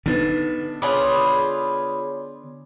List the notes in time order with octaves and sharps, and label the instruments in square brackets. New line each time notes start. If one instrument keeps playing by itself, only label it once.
[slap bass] D3 B3 [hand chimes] D4 D#4 B4
[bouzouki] F4 G#4 B4 [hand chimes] C#5 D5 D6